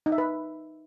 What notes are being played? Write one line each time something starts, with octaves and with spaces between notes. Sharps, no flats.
D#4
E5
B4